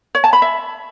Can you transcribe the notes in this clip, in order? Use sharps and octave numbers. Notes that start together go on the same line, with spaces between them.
C#5
A5
B5
E5